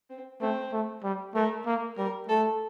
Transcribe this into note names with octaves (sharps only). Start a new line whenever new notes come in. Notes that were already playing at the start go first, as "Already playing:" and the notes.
C4
A3 C4
A3
G3
A3 A#4
A#3
G3 A#4
A3 A4